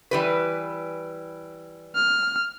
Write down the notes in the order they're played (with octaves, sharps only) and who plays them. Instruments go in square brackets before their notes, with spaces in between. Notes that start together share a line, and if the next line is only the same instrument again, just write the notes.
[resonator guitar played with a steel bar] E3 G3 B4
[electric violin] F6